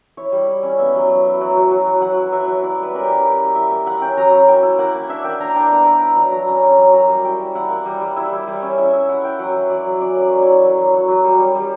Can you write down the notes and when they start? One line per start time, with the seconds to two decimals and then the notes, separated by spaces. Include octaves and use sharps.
0.17 E4 C#5
0.32 G3
0.48 E4
0.63 C#4
0.78 B3 E5
0.94 F#3
1.10 F#3
1.25 E4
1.41 F#3
1.56 F#3
1.71 F#3
1.87 F#3
2.01 F#3 F#5
2.17 E4
2.32 F#3 E5
2.48 F#3
2.63 E4 D5
2.78 G3
2.83 B4
2.94 C#4 A#4
3.04 G4
3.09 G3
3.24 A#3 G4
3.40 E4
3.55 E4 E5
3.71 A#3
3.86 E4 F#5
4.01 C#4 G5
4.17 F#3 A#5
4.32 C#4 B5
4.48 A#3 G5
4.63 E4
4.79 A#3 F#5
4.94 A#3
5.09 D4 E5
5.24 A#3 G5
5.40 D4 A#5
5.56 D4 G5
5.70 B3 A#5
5.86 E4 B5
6.01 E4 A#5
6.16 F#3 A#5
6.32 F#3 A#5
6.47 C#4 A#5
6.63 C#4 G5
6.78 F#3
6.93 A#3 A#5
7.09 G3
7.24 E4 G5
7.40 A#3
7.55 E4 F#5
7.70 A#3
7.85 G3
8.01 G3
8.16 E4 E5
8.32 G3
8.48 G3
8.62 C#4
8.78 E4 E5
8.93 E4 E5
9.09 E4 F#5
9.24 E4 G5
9.39 F#3 F#5
9.55 F#3
9.70 F#3 D5
9.86 F#3
10.01 C#4 D5
10.16 A#3
10.22 D5
10.32 F#3
10.42 E4 C#5
10.63 F#3
10.78 F#3
10.93 F#3
11.08 F#3
11.24 G3
11.39 G3
11.55 G3